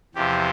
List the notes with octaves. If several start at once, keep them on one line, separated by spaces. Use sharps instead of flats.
E2 C3 F3 G4